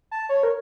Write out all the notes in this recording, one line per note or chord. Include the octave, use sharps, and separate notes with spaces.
A5
C#5
A#4